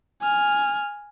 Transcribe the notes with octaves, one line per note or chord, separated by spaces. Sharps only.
G#5 F6